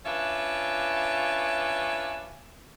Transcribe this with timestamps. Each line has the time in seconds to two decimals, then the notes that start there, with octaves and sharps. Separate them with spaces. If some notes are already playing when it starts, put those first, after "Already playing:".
0.06 C#4 D4 F4 B4 E5